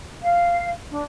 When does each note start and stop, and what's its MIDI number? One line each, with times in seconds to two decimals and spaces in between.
0.22 0.71 77
0.90 1.02 62